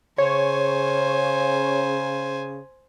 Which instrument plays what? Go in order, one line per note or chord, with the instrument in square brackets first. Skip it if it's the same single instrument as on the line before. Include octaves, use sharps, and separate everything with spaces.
[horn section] C#3 [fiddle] C5 G#5 [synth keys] C#5